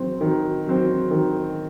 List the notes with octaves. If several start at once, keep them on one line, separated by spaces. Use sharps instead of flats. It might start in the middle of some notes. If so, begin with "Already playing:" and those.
Already playing: D#3 F#3 C4
D#3
F#3 C4
D#3